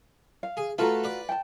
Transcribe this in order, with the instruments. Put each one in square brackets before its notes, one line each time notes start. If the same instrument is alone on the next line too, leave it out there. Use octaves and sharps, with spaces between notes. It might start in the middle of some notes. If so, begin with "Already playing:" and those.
[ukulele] F5
[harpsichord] G#4
[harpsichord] A3 A4 B4 [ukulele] F4 F#4 A#5
[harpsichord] B4 D5
[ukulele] G5 A5